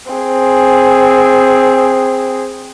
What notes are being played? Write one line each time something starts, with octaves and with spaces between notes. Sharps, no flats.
C4 G#4